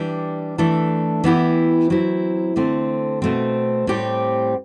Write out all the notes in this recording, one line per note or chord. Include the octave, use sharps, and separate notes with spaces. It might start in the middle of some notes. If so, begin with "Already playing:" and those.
Already playing: E3 G3 D4 G4
E3 A3 D4 A4
E3 B3 E4 G4
F#3 C4 E4
D3 A3 C4
B2 A3 C4
A2 G3 C4 G4